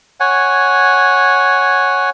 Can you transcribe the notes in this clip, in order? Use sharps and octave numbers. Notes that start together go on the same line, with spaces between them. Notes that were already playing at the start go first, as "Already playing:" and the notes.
C#5 F#5 G#5